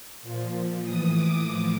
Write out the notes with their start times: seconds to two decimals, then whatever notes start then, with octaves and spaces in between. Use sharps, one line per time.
0.22 A#2 F3
0.83 A2 E3 D#6
1.14 D6
1.45 A2 F3 D6